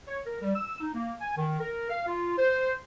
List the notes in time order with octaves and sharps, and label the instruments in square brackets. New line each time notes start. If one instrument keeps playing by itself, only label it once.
[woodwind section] C#5
A#4
G3
E6
D#4
A#3
G#5
D#3
A#4
F5
F4
C5